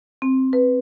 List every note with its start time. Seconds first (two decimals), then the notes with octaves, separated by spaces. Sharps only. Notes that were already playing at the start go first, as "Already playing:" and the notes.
0.22 C4
0.53 B4